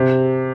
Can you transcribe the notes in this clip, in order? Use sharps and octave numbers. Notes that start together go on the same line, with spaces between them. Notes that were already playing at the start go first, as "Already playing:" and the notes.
Already playing: C3